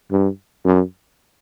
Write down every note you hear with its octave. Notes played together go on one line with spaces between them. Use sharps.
G2
F#2